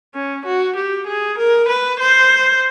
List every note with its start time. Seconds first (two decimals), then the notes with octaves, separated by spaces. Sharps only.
0.14 C#4
0.46 F#4
0.76 G4
1.07 G#4
1.38 A#4
1.69 B4
2.00 C5